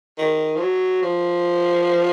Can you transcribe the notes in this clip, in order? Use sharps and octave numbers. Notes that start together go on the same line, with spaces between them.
D#3
F3
F#3
F3